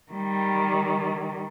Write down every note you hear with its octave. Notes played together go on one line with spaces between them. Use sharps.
D#3 G3